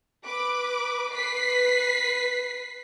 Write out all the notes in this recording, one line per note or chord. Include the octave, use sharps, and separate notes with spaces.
B4 D6
B4 B6 C7